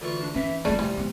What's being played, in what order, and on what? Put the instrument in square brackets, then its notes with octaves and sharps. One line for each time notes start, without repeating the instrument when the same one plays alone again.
[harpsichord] D2 E3 C#6 [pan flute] F4
[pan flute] D4
[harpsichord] E3 [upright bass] C#4 D#4 [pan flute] E5
[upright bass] F2 A#3 [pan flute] G3 [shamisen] A3 G#4 D5
[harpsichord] C3 F3 [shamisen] E3 [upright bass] A3
[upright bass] G#3 B3